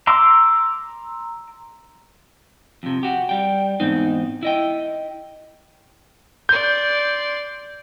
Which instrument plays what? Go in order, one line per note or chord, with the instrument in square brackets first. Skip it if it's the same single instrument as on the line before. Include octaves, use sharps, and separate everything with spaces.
[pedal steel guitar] A#5 C6 D6 E6
[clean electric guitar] F2 C3
F#4 G4
G3 G5
E2 G#2 C4 D#4
E4 D#5 G5
[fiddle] D5 C6 [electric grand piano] G6